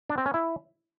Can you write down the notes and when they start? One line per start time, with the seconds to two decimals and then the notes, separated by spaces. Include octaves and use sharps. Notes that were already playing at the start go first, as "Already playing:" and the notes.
0.10 D4
0.18 C4
0.26 C#4
0.34 E4